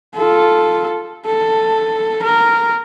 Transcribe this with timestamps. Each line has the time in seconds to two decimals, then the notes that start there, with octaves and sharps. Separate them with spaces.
0.16 F4 A4
1.26 A4
2.23 A#4